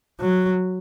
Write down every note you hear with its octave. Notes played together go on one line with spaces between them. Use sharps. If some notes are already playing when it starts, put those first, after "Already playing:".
F#3